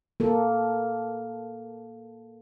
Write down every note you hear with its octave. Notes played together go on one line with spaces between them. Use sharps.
A#3 A4